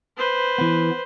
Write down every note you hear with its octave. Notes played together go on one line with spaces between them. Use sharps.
B4 C5
E3 B3